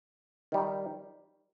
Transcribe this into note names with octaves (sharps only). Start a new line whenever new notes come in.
D#3 G3 D#4